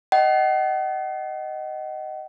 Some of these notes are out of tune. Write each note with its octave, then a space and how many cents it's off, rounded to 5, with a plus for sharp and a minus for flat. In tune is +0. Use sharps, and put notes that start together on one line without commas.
D#5 +0 F#5 +40